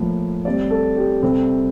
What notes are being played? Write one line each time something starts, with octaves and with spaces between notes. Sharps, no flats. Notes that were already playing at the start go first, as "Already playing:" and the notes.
Already playing: A2 F3 A#3
A2 G3 C4 D5
A4
G4
C2 C3 G3 C4 A4